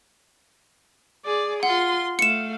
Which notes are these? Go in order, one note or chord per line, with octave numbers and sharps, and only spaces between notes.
G#4 D5
F4 F#5 C6
A3 F5 C#7 E7